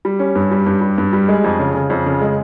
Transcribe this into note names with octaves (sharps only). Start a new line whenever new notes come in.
G3
C#4
G2
G3
G2
G3
G2
G3
G#3
F2
C#3
C#3
F2
C#3
G#3